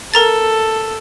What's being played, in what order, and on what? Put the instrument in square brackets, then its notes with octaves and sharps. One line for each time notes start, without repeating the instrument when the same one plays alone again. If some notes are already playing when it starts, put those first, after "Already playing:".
[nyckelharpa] A4 [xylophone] A#4 A#5 A6